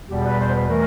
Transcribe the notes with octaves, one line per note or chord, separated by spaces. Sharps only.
E2 B2 G3 G4
B4
C5
B4
E3 A3 A#4